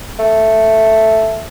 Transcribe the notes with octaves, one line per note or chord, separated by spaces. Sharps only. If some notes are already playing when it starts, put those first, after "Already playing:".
A3